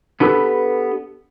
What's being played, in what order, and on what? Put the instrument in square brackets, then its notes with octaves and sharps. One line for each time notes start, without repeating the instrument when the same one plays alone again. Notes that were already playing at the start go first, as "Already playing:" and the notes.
[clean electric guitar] B3 D4 G4 A4 B4